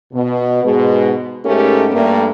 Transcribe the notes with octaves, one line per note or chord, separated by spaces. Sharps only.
B2
G#2 B2 G#3
G#2 G#3 A3 C#4 G4 A#4
G2 A3 A#3